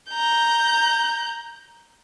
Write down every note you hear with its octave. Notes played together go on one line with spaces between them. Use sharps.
A#5 G6